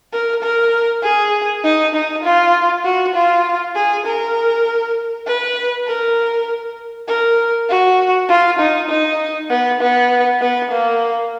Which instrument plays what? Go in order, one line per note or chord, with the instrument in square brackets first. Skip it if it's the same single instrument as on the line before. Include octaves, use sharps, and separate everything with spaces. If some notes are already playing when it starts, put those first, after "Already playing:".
[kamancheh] A#4
A#4
G#4
D#4
D#4
F4
F#4
F4
G#4
A#4
B4
A#4
A#4
F#4
F4
D#4
D#4
B3
B3
B3
A#3